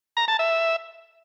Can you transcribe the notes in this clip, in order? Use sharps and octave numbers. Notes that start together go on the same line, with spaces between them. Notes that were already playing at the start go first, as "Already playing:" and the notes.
A#5
A5
E5